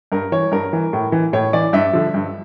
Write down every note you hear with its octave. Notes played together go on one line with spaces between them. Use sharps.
G2 A#4
E3 C#5
G2 A#4
E3
A2
E3
A2 C#5
E3 D5
G2 E5
D3 F3
G2